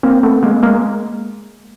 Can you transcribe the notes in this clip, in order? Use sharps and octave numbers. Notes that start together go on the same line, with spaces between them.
A#3 C4
A3 B3
G#3 A#3
G#3 A#3